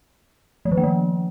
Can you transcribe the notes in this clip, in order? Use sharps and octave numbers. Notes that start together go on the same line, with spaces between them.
F3
D#3
A#3
F3